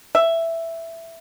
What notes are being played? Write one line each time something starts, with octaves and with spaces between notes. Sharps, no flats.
E5